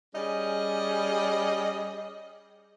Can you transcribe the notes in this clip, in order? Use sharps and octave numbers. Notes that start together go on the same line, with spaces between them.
G3 C#4 G#4 D#5